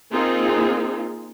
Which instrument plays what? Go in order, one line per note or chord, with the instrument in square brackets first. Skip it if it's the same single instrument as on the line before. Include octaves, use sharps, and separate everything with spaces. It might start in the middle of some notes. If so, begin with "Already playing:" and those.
[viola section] A#3 C4 D#4 F4 G#4